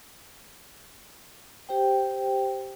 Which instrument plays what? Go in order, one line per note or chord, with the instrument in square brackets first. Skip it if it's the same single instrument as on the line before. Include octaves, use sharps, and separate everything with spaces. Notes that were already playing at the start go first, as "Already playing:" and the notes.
[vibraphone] G4 C5 G5